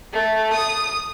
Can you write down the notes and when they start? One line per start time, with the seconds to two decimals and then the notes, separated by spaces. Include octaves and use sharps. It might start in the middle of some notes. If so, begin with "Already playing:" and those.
0.13 A3
0.53 D#6